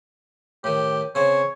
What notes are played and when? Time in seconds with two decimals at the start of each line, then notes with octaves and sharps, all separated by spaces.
0.64 A2 D#3 G4
1.15 C#3 C4 C#5